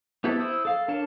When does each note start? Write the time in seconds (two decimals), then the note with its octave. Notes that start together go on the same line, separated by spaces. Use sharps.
0.24 B3 C4 E4 G4 A4
0.39 E4 C5 D#6 E6
0.65 A4 F5
0.88 D4 A4 A#4 C#5 A5